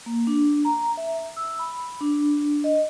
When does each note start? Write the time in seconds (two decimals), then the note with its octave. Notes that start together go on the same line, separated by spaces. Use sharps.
0.06 A#3
0.27 D4
0.65 A#5
0.97 E5
1.37 E6
1.59 B5
2.01 D4
2.64 D#5